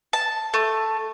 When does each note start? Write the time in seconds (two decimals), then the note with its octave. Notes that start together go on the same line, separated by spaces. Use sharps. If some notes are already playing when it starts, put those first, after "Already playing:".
0.13 A5
0.54 A3